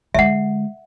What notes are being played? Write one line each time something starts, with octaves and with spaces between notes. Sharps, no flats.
D3 G#3 E5 F#5